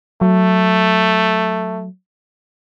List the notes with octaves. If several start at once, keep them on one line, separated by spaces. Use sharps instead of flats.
F#3 A3